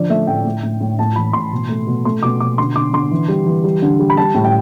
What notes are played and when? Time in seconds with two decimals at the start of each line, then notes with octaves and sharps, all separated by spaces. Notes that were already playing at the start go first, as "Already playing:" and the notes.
Already playing: D3 F3 D5
0.09 A3 E5
0.27 A2 G5
0.45 A2
0.63 A2
0.81 A2
0.99 A2 A5
1.16 E3 B5
1.33 A2 C6
1.52 B2
1.69 A3
1.87 B2
2.05 A3 C6
2.23 B2 D6
2.40 B2 D6
2.58 D3 C6
2.76 D3 D6
2.93 D3 C6
3.11 E3
3.28 G3
3.46 E3
3.64 G3
3.82 D3
4.00 G3
4.10 B5
4.17 G3 A5
4.35 A2
4.44 G5